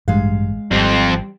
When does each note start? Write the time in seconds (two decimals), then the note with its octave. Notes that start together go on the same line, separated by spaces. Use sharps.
0.08 A1 G2 G#3 F5
0.71 G#1 F2 G3 C4